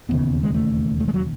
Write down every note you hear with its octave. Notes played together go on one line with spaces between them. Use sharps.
E1 D#2 C#3 B3
G#3
A3
A3
G#3
F#3